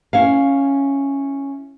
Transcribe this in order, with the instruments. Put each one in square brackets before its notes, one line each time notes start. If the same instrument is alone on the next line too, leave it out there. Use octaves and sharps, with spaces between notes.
[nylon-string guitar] C#4 E4 F5